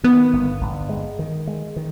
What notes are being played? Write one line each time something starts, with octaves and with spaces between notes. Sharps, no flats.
D#3 B3
G1
G1
G#3
D#3
G#3
D#3